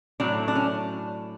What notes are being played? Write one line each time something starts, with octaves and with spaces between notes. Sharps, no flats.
A2 F#3 A3 D4
D4
C#4